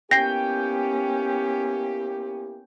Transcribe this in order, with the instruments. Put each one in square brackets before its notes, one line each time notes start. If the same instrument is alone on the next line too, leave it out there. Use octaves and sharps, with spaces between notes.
[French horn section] A#3 E4 G4 [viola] B3 C#4 [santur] G5 [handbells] A#6 C7